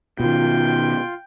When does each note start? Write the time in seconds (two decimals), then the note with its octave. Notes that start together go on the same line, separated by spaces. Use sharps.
0.20 B2 D#3 F4 G5